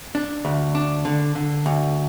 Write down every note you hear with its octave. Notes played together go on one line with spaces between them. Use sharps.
D4
D2
D4
D3
D3
D2